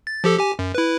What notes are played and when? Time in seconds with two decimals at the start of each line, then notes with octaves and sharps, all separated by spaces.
0.07 A6
0.24 F3 G4 A4
0.38 G4 G#5
0.59 F#2
0.75 E4 B4